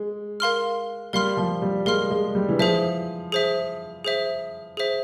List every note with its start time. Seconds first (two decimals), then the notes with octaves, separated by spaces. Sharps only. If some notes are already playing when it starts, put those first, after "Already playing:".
Already playing: G#3
0.40 A#4 F5 C6 F6
1.13 G3 A#4 F5 C6 F6
1.37 F3
1.62 G3
1.86 G#3 A#4 F5 C6 F6
2.10 G#3
2.35 G3
2.49 E3
2.59 F3 G#4 C5 E5
3.32 G#4 C5 E5
4.04 G#4 C5 E5
4.77 G#4 C5 E5